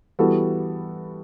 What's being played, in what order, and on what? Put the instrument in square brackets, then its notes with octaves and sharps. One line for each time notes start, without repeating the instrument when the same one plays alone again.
[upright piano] E3 G3 B3 F#4 A4